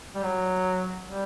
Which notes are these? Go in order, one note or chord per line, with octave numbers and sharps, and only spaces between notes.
G3
F#3
G3